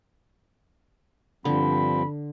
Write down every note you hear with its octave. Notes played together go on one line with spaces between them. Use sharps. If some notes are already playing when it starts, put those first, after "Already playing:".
G2 D3 F3 C4 B5